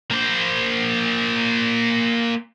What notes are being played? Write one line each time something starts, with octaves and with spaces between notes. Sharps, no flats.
A#3 C5